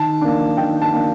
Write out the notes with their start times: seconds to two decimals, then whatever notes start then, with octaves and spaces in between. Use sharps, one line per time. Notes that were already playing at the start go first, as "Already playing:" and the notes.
Already playing: D#3 A5
0.21 A#3 D4
0.57 D#3 G5
0.82 A5
0.93 A#3 D4